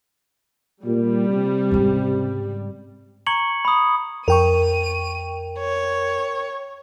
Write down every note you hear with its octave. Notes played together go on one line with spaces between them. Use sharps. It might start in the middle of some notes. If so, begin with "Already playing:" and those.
A#2 G3
C3
G#2 C#3
A#5 C#6 G#6 C#7 F#7
B5 D#6
F2 A#4 G5 C#6 D#7
C#5